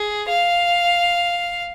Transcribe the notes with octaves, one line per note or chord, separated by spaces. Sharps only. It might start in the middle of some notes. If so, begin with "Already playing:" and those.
Already playing: G#4
F5